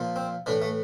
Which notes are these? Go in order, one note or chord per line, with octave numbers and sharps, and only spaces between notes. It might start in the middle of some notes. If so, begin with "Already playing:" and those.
Already playing: A#2 F3
C4
A2 E3 D4
A3